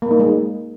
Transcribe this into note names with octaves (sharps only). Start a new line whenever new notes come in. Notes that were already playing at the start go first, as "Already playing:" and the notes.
A#3
D#4
G#3